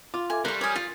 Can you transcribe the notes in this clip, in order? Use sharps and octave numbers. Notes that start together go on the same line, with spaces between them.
F4 D6
A4 E5 G#5 D6
G3 A#4 C6 C#6 F#6
C#5 G#5 D6 D#6 F6
F4 A6